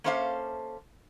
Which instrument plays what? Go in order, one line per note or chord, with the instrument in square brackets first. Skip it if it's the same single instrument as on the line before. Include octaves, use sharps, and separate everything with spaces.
[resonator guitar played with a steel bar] A#3 C#4 A4 C5 E5 F5